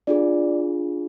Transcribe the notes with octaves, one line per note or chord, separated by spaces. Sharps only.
D4 F4 G#4 D5